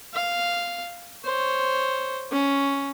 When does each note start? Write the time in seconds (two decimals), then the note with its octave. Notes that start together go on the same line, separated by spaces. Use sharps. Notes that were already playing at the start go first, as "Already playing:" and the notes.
0.14 F5
1.25 C5 C#5
2.32 C#4